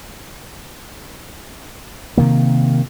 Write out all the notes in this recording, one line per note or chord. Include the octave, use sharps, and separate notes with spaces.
C3 D#3 A#3